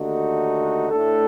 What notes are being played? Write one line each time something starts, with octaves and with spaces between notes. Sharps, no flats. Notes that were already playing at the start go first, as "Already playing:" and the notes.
Already playing: D#2 D3 A3 D#4 F#4
A2 A3 D4 A4